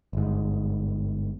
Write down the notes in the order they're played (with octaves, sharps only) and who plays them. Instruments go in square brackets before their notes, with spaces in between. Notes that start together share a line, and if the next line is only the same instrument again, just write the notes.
[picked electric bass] G1 G#2